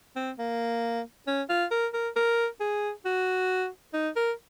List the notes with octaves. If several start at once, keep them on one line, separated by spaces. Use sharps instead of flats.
C4
A#3
C#4
F4
A#4
A#4
A#4
G#4
F#4
D#4
A#4